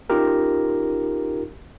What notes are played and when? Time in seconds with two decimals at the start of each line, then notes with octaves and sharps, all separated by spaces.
0.10 C#4 D#4 F4 G4 A#4